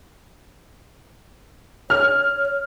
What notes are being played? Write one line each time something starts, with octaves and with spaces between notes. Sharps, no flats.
C#5 F6